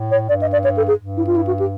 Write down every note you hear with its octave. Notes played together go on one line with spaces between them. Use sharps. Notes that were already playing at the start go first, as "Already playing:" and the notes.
Already playing: A2
C#5
G2 D5
D#5
D5
C#5
A4
G#4
G2
E4
F4
E4
F#4
G4